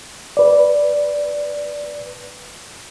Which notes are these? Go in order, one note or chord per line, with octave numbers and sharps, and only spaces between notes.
B4 D5